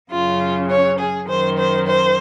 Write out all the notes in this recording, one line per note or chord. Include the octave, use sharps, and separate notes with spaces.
F#2 C#3 F4
C#5
G#4
F#2 D#3 C5
C5
C5